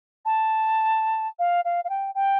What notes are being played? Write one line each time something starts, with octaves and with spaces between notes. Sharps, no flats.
A5
F5
F5
F5
G5
G5